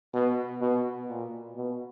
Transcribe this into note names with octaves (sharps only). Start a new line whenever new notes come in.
B2
B2
A#2
B2